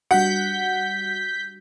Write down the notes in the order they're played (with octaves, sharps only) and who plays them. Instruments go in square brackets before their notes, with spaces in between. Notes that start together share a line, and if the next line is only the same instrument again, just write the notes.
[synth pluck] G3 D4 F#4 [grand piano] F#5 [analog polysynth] G6 B6